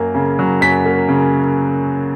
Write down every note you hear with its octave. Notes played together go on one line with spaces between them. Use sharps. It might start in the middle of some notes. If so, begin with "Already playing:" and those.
Already playing: F#2 A#3
C#3
F#3
F#2 B6
A#3
C#3